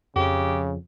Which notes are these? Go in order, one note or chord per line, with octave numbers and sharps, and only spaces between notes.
F2 C#3 G4